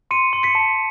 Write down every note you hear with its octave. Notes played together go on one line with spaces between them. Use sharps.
C6 C#7 D#7
C6
B6 C#7
A5